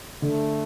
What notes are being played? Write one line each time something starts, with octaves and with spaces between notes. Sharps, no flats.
D3 A3